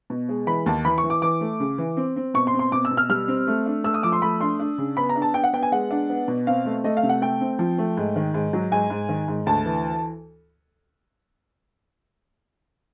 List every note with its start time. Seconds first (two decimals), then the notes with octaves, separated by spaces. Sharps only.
0.10 B2
0.29 G#3
0.47 E3 B5
0.66 D#2 A5
0.85 E3 B5
0.98 C#6
1.04 E3
1.10 D6
1.22 E3 D6
1.41 A3
1.60 C#3
1.78 E3
1.97 C4
2.16 C4
2.34 B2 C#6
2.47 C6
2.53 C4
2.59 C6
2.72 B2 D6
2.85 E6
2.91 B2
2.97 F6
3.09 G3 F6
3.28 C4
3.47 A3
3.66 D4
3.84 A3 E6
3.94 D#6
4.03 F3 D6
4.12 C6
4.22 A3 B5
4.40 D4 C6
4.59 D4
4.78 C#3
4.97 B3 B5
5.09 A#5
5.16 D4
5.22 A5
5.34 D4 G5
5.44 F#5
5.53 B3 G5
5.63 G#5
5.72 G#3 F#5
5.90 D4
6.10 B3
6.28 B2
6.47 C4 F5
6.65 A3
6.84 A3 D#5
6.97 F5
7.03 C3
7.09 F#5
7.22 A3 G5
7.41 C4
7.59 F3
7.78 A3
7.97 G#2
8.16 D#3
8.34 G#2
8.53 F#3
8.72 G#2 G#5
8.90 G#2
9.09 D#3
9.28 G#2
9.46 D2 A5
9.65 E3